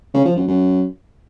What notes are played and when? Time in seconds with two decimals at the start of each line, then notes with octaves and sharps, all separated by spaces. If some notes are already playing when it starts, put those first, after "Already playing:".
0.14 C#3
0.25 F3
0.36 F#2
0.47 F#2